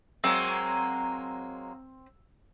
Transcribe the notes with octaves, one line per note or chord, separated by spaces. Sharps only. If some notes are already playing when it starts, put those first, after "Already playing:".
F#3 G#3 A#3 C4 E6